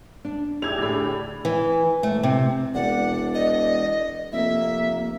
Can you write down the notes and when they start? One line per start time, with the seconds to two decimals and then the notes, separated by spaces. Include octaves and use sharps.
0.25 D4
0.62 E4 G4 G#4 D5 E6 G#6 F7
0.78 A2 D3 B5
1.45 E3
2.03 A3
2.23 C3
2.74 E1 D5 F#5
3.34 D#5
4.32 F1 A#3 E5